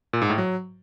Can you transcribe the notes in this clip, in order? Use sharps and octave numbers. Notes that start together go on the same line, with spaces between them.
A#2
G#2
A2
F#3